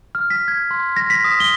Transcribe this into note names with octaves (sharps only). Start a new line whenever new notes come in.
F6
B6
G#6
C6
A#6
B6
D#6
G7